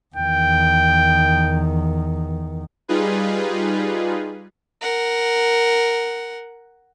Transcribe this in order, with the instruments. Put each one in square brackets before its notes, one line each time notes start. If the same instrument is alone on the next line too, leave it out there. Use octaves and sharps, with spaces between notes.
[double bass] E2 D#3 [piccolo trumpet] G5
[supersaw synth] G3 D#4 F4 G#4 B4
[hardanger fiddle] A#4 F#5